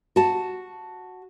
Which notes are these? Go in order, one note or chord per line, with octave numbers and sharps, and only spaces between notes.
F#4 A5